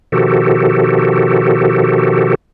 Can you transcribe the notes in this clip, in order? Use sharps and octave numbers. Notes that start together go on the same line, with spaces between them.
B2 D#3 F3 F#4 G4 A4